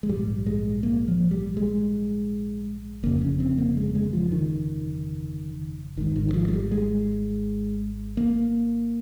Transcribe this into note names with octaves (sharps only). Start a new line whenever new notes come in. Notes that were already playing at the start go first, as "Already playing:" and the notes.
G#3
A#1 G#2 G3
G#3
A#3
F3
G3
G#3
G1 F2 C#3 A#3
C#4
C4
A#3
G#3
G#3
F3
D#3
G#1 G#2 D#3
D#3
D#3
F3
G#3
G3
G#3
A#3